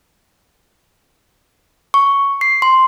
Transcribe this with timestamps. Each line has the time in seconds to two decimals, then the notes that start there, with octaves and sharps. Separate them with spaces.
1.94 C#6
2.41 C7
2.62 C6